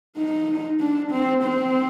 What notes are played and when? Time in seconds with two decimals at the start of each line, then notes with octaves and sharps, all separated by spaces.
0.17 D#4
0.80 D4
1.12 C4
1.43 C4